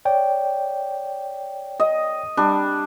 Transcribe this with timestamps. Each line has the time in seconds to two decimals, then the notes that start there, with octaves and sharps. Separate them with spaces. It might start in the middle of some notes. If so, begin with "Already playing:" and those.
0.05 C#5 D5 G5
1.80 D#5
2.37 G3 D4